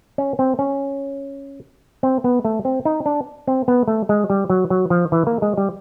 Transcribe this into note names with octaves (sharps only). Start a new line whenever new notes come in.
C#4
C4
C#4
C4
B3
A3
C4
D#4
D4
C4
B3
A3
G#3
G3
F#3
F#3
F3
E3
A#3
G#3
G3